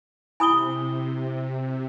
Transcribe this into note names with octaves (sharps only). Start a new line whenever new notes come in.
C3 E4 G#5 B5 D#6 G7